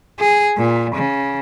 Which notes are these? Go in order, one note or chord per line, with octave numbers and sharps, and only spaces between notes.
G#4
A#2
C#3